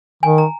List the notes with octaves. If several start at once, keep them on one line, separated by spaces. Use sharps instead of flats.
D#3 G#5
A#5